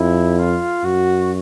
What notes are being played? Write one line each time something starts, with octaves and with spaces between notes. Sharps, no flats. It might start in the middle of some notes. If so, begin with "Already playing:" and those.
Already playing: F2 E4
F4
F#2 F#4